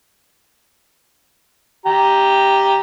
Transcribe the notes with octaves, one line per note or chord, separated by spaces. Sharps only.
G4 A#5